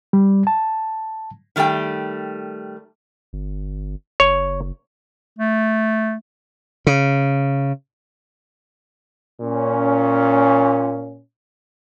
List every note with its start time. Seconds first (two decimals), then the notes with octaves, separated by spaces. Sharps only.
0.13 G3
0.47 A5
1.56 D#3 G3 A3 G#4 G5
3.33 G1
4.20 F#1 C#5
5.39 A3
6.87 C#3
9.41 A#2 C#4